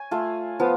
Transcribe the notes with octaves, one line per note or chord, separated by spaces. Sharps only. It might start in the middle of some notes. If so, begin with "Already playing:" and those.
Already playing: C#5 G#5
A3 F4
F3 B3 F4